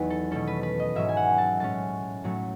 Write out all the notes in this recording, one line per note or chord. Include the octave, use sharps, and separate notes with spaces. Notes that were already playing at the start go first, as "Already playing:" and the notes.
Already playing: E2 D#3 F#3 B3 B4 F#5
A4
B2 A3 C#4 A4
B4
B4
D#5
G#2 F#3 C#4 E5
G#5
F#5
A5
A2 G#3 C#4 A5
A2 F#3 A3